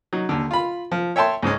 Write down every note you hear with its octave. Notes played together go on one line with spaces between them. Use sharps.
F#3 D#4
D#2 D3
F4 B5
F3
C#5 E5 G5 A5 C6
C#2 G#2 G#3 C#4